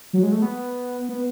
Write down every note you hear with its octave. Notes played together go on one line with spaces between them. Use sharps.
F#3
G#3
A3
B3
B3